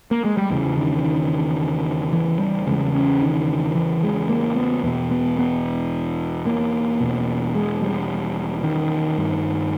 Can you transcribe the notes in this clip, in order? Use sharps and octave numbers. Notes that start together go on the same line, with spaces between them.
A#3
G#3
G3
E2 C#3 E3
D#3
D#3
E3
G3
E2 C#3 G#3
C#4
D#3
E3
G#3
A#3
B3
E2 B2 B3
B3
B3
A#3
E2 B2
G#3
G3
D#3
G2